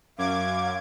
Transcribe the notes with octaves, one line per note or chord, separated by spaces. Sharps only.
F#2 F5 D6 G#6